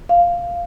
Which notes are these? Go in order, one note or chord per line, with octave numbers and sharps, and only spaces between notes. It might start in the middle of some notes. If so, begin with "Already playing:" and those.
F5